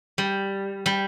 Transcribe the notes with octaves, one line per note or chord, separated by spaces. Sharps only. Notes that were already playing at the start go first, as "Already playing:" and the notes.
G3
G3